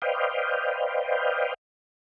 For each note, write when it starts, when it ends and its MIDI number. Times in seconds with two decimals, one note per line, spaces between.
0.02 1.54 71
0.02 1.54 72
0.02 1.54 74
0.02 1.54 75
0.02 1.54 77
0.02 1.54 79